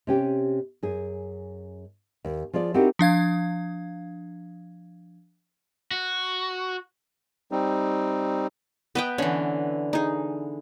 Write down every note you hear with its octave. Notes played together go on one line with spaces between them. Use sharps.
C3 C#4 G4
F#2 G#4
D#2
F3 F4 G#4 D5
C4 D#4 E4 F#4 G4 A#4
F3 D4 F5 G#6
F#4
G3 C4 D#4
B3 B4 D#5 G5
D3 E3 C#4
D#4 G#4